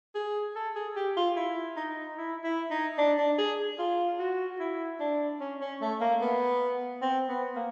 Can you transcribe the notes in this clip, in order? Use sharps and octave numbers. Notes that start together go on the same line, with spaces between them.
G#4
A4
G#4
G4
F4
E4
D#4
E4
E4
D#4
D4
D4
G#4
F4
F#4
E4
D4
C#4
C#4
A3
A#3
B3
C4
B3
A#3